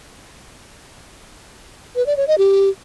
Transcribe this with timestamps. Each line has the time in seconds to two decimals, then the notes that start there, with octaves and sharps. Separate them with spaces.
1.96 B4
2.06 D5
2.17 C#5
2.28 D#5
2.38 G4